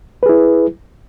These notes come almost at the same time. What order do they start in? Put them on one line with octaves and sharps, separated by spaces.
B4 G#4 E4